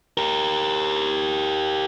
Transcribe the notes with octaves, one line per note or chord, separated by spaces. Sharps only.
G4 A#4